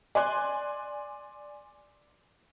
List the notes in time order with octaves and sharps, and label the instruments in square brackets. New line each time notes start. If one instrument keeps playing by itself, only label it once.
[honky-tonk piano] D5 G#5 C6 F#6